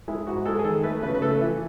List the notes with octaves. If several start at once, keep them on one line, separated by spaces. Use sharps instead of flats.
G#3 E4
G#2 F#4
G#3 A4
G#4
D#3 A4
A3 B4
C#3 B4
B4
A3 A4
E3